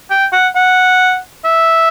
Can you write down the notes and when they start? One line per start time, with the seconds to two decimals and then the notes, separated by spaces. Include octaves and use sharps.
0.11 G5
0.33 F#5
0.56 F#5
1.45 E5